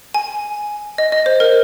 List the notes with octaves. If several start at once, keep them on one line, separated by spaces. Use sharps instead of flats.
G#5
D#5
D#5
C5
A#4